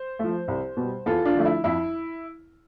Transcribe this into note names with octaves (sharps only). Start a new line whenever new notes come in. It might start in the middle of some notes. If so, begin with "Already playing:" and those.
Already playing: C5
F3 A3
C2
B2 G3
E2 F4 A4
D4 F4
D3 F3 A3
E4
F2 E4